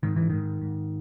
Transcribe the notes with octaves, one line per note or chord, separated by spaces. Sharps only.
G#2 D#3
E3
G#2 D#3
G#2